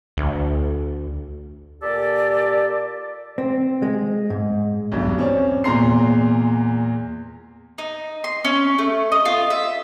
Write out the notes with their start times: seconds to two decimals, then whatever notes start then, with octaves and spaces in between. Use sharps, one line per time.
0.17 D2
1.82 A#2 G4 A4 D5
3.38 C4
3.82 G#3
4.30 G#2
4.92 B1 E2 G2
5.18 C4 C#4 C#5 D5
5.64 E2 A#2 G#3 A#5 C6 C7
7.78 D#4
8.24 C6
8.45 C#4
8.78 A3
9.12 D#5
9.25 F4
9.50 E5